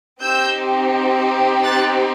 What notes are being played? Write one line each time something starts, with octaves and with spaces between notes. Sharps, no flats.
C4 D#4 G4 E6 G6
F#6 A6